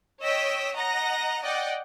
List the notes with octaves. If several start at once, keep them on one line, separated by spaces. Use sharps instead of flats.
C#5 D#5 G5 E6 B6
D#5 F#5 A#5 A#6
D5 D#5 F#5 G5